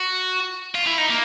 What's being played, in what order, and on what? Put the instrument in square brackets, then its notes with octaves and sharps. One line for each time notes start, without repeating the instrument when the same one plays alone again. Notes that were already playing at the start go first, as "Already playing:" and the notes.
Already playing: [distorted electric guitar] F#4
F4
E4
D#4
A#3